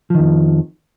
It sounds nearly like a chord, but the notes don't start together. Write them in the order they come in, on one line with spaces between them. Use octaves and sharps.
F3 D#3 F2